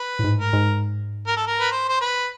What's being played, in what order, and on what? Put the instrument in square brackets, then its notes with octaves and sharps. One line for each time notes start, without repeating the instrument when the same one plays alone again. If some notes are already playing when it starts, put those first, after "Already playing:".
Already playing: [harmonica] B4
[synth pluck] A2
G#2
[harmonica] A#4
[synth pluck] G#2
[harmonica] A#4
A4
A#4
B4
C5
C5
B4